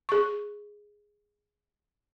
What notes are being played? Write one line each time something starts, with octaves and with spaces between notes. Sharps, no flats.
G#4 C#6